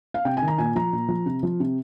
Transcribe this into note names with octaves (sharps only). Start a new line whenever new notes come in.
F5
C3 G5
G#5
D#3
A#5
A#2 G#5
F3 A#5
A#2
F3
C3
F3
C3